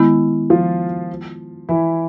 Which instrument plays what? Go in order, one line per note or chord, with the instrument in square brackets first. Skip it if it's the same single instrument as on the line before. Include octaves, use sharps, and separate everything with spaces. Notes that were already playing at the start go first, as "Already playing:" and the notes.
Already playing: [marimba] D#3 G#3 B3 E4
[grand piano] F3 F4
E3 E4